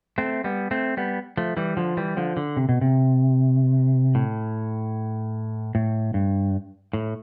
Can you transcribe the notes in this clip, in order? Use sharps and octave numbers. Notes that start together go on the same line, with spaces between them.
A3 C4
G3 B3
A3 C4
G3 B3
F3 A3
E3 G3
D3 F3
E3 G3
D3 F3
D3
C3
B2
C3
A2
A2
G2
A2